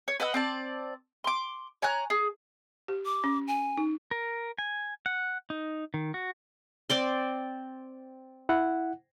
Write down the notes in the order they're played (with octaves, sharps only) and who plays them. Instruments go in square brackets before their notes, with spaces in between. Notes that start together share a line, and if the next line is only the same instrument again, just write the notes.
[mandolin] C#5
B4 D#5 F#5 E6
C4 D5 A5
C6 D6
C#5 G#5 A#5 F#6
G#4
[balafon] G4
[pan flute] D6
[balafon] C#4
[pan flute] G#5
[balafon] D#4
[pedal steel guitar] A#4
G#5
F#5
D#4
D#3
F#4
[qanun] C4 D5 C6
[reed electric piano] E4 F#5